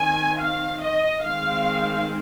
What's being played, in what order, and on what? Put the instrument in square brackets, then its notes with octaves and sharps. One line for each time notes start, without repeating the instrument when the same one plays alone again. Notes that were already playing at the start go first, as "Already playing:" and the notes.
Already playing: [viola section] D#3 C4 G#5
F5
D#5
D#3 G#3 C4 F5